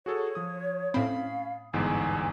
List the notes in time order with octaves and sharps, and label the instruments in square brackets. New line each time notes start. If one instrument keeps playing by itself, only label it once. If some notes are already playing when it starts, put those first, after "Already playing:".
[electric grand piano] F#4 G#4 A4 [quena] C#5
[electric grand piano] F3 D#6
[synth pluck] A2 C4 [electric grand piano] C#4 B5 [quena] F5
[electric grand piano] G1 E2 G#2 [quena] G#5